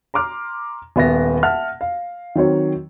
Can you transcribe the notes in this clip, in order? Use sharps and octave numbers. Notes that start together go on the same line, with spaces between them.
A#5 C6 D6 F6
D#1 B3 E5 A#6
E5 F#5 A5 F6
F5
D#3 F#3 C4 C#5